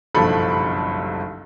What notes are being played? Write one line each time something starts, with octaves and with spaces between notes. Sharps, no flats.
F#1 B1 G2 F3 A4 B5